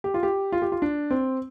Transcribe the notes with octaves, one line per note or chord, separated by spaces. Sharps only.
G4
F4
G4
F4
G4
F4
D4
C4